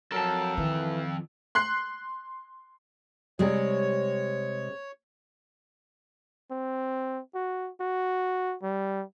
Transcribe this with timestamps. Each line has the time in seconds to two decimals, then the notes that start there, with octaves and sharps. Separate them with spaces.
0.12 F2 F#3 A4 A#4 A5
0.57 D#3 E3
1.55 C6 F#6 C7
3.39 C3 G3 G#3 C#5
6.51 C4
7.35 F#4
7.80 F#4
8.62 G3